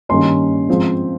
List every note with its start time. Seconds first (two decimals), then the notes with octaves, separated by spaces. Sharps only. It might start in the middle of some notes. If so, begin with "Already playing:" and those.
0.09 G2 D#3 A#3 C#4 C6
0.69 G#2 F3 C4